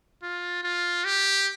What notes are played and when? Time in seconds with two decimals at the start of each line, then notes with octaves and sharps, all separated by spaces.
0.22 F4
0.63 F4
1.05 G4